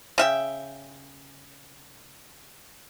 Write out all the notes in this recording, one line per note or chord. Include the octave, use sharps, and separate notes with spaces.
C#3 E5 G5